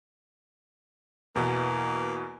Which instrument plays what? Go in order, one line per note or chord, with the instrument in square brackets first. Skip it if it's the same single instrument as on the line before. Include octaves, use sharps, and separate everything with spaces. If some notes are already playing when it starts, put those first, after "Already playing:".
[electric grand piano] E2 B2 E3 [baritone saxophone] A#3